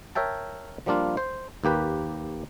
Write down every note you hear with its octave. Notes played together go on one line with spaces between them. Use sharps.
A#4 C#5 E5 G5 A5
F3 G3 A#3 D4 F4
C5
D#2 A#3 G4 B4